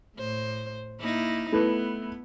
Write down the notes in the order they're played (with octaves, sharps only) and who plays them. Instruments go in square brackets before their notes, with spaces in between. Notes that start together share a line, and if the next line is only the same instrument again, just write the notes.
[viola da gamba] A2 C5
A#3 D#4 E4
[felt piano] A3 E4 B4 [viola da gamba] B3